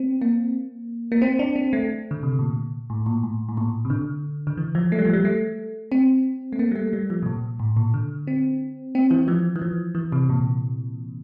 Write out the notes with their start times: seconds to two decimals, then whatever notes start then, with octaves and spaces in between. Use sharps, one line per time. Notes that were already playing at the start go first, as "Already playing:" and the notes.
Already playing: C4
0.22 A#3
1.12 A#3
1.22 C4
1.39 D4
1.56 C4
1.73 A3
2.11 D3
2.23 C3
2.39 A#2
2.90 A2
3.06 A#2
3.23 A2
3.49 A2
3.57 A#2
3.85 C3
3.90 D3
4.47 D3
4.57 E3
4.75 F3
4.92 A3
4.99 G3
5.06 F3
5.13 G3
5.25 A3
5.92 C4
6.53 A3
6.59 A#3
6.71 G3
6.76 A3
6.93 G3
7.10 F3
7.22 C3
7.26 A#2
7.60 A2
7.77 A#2
7.94 D3
8.27 C4
8.95 C4
9.11 E3
9.28 F3
9.56 E3
9.62 F3
9.95 E3
10.12 C3
10.29 A#2